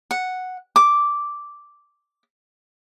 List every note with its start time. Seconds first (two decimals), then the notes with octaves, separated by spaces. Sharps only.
0.11 F#5
0.76 D6